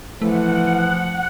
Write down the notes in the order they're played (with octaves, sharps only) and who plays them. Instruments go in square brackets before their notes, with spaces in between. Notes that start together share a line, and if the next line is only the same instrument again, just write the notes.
[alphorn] E3 [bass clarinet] F3 [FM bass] A3 [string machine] F#5